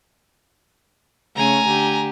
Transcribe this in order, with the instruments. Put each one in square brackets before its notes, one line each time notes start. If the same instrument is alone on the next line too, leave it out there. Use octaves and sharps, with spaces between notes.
[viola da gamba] C#3 A3 C#4 [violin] G#5 A#5
[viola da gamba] D3 G4